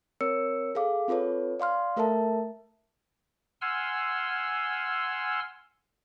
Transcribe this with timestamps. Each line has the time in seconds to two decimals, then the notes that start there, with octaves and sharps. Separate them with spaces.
0.21 C4 A#4 C#5 E6 C#7
0.75 G#4 A4 F5 D6
1.08 C4 F4 A4 B4 C#5
1.60 D5 F5 C6 F6
1.96 A3 A4 A#4 E5 A5
3.61 F#5 G#5 C6 E6 F6